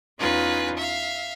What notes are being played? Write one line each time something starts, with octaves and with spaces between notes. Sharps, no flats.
E2 C#4 D#4 F4 B4 G#5
E5 F5